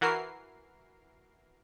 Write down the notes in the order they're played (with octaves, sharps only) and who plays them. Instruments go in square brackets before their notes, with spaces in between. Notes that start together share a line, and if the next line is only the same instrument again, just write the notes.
[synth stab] E3 F#4 A#4 C7